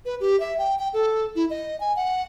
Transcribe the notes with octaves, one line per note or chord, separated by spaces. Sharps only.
B4
G4
E5
G5
G5
A4
E4
D#5
G#5
F#5